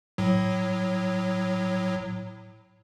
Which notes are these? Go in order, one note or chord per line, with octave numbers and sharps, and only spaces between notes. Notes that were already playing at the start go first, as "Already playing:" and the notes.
A2 F#3